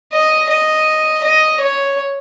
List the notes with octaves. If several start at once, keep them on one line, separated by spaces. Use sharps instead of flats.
D#5
D#5
D#5
C#5